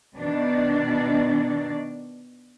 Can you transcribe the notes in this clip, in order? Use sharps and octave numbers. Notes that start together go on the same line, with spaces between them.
B2 D#3 D4